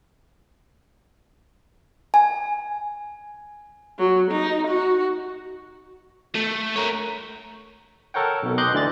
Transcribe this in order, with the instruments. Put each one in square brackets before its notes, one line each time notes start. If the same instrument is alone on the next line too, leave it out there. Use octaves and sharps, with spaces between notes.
[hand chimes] G#5
[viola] F#3
D#4
F#4
[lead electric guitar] A3
A#4 C#5
[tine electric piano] A4 A#4 C#5 F#5 G5
B1 B2
D#5 C6 D6 F#6 G6
D2 D3 E3 D5 A6